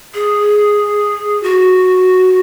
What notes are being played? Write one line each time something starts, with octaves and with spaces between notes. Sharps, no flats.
G#4
F#4